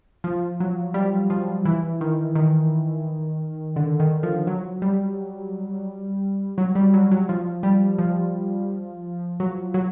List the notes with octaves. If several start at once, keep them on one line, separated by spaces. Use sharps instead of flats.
F3
F#3
G3
F3
E3
D#3
D#3
D3
D#3
F3
F#3
G3
F#3
G3
F#3
F#3
F3
G3
F3
F#3
F#3